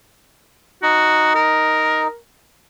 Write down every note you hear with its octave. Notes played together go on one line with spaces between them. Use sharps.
D#4 F#4
A#4